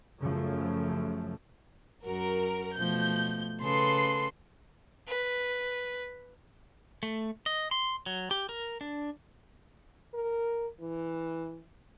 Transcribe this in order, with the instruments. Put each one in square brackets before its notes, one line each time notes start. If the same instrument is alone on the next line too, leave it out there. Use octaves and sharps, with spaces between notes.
[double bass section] F#2 C#3 F3 A3
[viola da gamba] F#2 F#4 [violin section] A#4
[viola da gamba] B2 F3 A3 [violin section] G6
[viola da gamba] C#3 A4 B4 [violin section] C6
[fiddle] B4
[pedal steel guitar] A3
D#5
C6
F#3
G4
A#4
D4
[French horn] A#4
E3